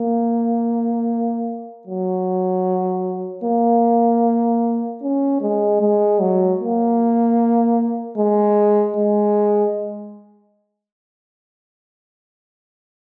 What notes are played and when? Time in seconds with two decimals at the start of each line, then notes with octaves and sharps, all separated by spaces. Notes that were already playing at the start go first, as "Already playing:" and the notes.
Already playing: A#3
1.87 F#3
3.44 A#3
5.02 C#4
5.42 G#3
5.81 G#3
6.20 F#3
6.61 A#3
8.17 G#3
8.96 G#3